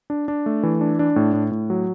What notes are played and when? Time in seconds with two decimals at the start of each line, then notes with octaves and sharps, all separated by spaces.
0.10 D4
0.28 D4
0.46 A3
0.63 E3
0.81 D4
0.99 D4
1.16 A2
1.34 A2
1.51 A2
1.70 F#3